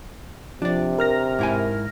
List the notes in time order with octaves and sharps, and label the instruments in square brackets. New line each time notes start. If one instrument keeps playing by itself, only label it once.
[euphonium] C3 [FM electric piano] F3 [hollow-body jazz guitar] D4 D5
[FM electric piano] A#4 F6 A#6
[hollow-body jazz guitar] G#2 E4 G#5